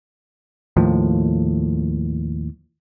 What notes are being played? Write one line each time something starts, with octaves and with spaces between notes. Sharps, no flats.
D#2 A2 F3